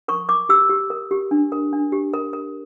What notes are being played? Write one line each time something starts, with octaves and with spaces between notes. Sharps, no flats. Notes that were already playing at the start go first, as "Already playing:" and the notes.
A#4 C#6
A#4 D6
G4 E6
G4
A#4
G4
D4
A#4
D4
G4
A#4
A#4